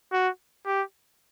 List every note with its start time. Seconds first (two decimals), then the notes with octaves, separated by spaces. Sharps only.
0.13 F#4
0.66 G4